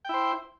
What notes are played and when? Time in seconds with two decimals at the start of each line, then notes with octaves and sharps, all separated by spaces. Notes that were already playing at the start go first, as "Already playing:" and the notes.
0.05 G5
0.09 E4
0.14 C5